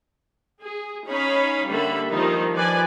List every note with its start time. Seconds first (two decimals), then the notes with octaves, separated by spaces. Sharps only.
0.63 G#4
1.07 C#4 D#4 C#5 F5 B5
1.68 D3 G3 A#3 A4 E5 B5
2.10 D#3 F3 G3 D#4 F4 A#4
2.55 F3 B4 D5 G#5